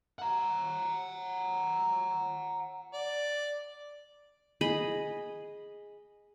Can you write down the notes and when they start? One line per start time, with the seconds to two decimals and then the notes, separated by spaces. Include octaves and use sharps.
0.19 F#5 A#5
2.93 D5
4.61 G#4 D#5 B5